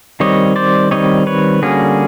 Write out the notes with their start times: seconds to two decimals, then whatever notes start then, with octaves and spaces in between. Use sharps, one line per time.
0.20 D#3 G3 C4 C#5 D#5
0.56 C5 D5
0.91 D#3 G3 C4 C#5 D#5
1.27 B4 C#5
1.62 D3 G3 A#3 C#4 F#4 G#4